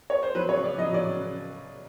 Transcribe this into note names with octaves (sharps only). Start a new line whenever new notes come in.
C#5
C5
F#3 B4
C#3 C#5
C#3 D5
F#3 D#5
F#3 D5
C#3